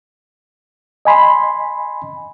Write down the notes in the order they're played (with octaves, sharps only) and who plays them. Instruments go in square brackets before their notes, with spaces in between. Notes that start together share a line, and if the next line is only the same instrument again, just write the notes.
[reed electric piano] D#5 G#5 B5 C6